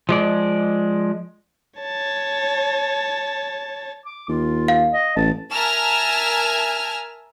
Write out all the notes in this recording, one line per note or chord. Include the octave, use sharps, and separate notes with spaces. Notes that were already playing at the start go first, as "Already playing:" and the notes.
F3 G#3 D5
C#5 A5
D6
D#2 F4
F5
D#5
A1 A5
A#4 E5 G#5 A5 F6